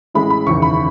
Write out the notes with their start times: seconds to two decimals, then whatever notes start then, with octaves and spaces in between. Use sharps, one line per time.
0.14 A1 A2 G#3 B5
0.30 B5
0.46 F#1 E2 D#3 C#6
0.62 B5